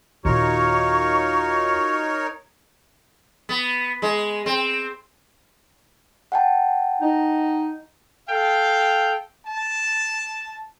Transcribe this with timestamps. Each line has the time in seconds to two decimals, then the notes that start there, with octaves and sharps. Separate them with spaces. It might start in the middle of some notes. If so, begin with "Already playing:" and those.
0.25 D#2 A#2 D#4 F4 F#4 A#4 C#5 C#6
3.49 B3
4.02 G#3
4.46 C4
6.32 F#5 G5 A5
7.00 D#4
8.29 A4 F5 G5
9.46 A5